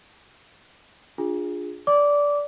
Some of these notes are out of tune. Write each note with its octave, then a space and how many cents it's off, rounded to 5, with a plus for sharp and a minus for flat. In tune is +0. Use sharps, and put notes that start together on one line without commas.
D4 +0 F4 +25 G#4 +0
D5 -15 D6 -15